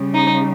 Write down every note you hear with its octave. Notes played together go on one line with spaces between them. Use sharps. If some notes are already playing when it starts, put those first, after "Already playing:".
Already playing: C#3 G3
D#4